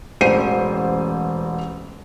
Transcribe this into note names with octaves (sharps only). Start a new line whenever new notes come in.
E1 A1 C5 C7 D#7